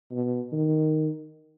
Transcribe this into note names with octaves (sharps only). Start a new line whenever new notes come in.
B2
D#3